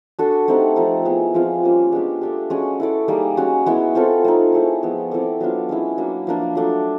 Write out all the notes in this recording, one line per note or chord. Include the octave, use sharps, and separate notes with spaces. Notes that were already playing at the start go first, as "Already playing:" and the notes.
D4 F#4 A4
A3 C4 D#4 G4
F3 A3 C4 D#4
B3 E4 G#4
F3 G#3 C4 F4
G3 A#3 C#4 F4
G#3 B3 D4 G4
A3 D4 G4
G#3 C#4 F#4
E4 A4 D5
G3 A#3 D#4 G#4
G#3 C#4 F#4
G#3 B3 E4
C4 F4 A4
A3 C4 D#4
C4 E4 G#4 C#5
F3 G#3 B3
C4 E4 A4 D5
F#3 B3 D4 F4
G#3 C#4 E4
F#3 A#3 D4
F3 A#3 D4
F#3 A3 D4